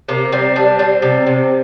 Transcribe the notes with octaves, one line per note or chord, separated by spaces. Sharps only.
C3 A#3
G3 C4
G3 D4
G3 C4
C3
C3